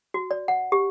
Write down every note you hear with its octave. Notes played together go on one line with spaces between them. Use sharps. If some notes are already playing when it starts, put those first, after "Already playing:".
F#4
D5
F#5
G4